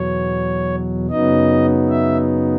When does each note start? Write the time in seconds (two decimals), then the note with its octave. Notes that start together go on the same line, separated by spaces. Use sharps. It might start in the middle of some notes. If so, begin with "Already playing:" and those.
Already playing: E2 B2 F#3 C#5
1.10 F#2 C#3 F#3 B3 D#4 D#5
1.90 E5